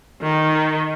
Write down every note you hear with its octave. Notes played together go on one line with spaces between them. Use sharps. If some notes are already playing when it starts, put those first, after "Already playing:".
D#3